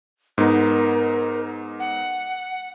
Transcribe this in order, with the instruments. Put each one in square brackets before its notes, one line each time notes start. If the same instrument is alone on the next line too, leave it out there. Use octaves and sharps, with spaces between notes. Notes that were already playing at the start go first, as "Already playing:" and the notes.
[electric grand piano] G#2 B3 D#4 [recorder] A#4
[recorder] F#5